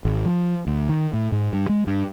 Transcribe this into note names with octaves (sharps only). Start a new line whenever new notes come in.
G#1
F3
D2
D#3
A2
G#2
G2
G#3
G2